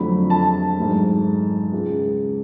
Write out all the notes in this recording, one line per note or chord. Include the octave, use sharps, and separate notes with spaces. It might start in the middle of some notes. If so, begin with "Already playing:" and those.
Already playing: F2 D3 F#3 A3 B5
A5
G#1 G#2 F#3 A3
C#2 C#3 G#3